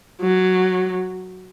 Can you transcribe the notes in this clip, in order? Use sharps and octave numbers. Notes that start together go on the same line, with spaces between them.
F#3